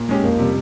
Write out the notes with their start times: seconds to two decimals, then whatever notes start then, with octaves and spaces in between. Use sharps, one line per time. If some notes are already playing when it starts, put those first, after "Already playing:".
Already playing: A#2
0.09 G#3 C#4 G4
0.23 F2 A#3
0.39 C3 G3